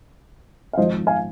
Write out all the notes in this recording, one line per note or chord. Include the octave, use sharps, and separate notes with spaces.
F5
G#1 G#2 F3 C5 D#5
F5 G#5